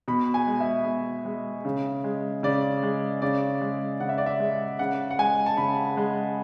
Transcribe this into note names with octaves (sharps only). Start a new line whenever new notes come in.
B2 B5
G#5
G#3
E5
B2
G#3
C#3
G#3
C#3 D5
G#3
C#3 D5
G#3
C#3 F#5
E5
D5
E5
G#3
C#3 F#5
F#5
G#3 G#5
A5
C#3 B5
G#3